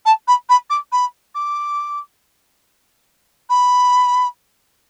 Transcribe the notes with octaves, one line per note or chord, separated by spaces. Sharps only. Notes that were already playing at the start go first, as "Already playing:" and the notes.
A5
B5
B5
D6
B5
D6
B5